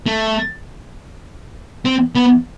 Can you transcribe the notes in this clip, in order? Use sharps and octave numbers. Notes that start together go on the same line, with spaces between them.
A3
C4
B3